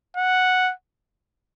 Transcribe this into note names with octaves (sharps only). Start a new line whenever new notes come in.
F#5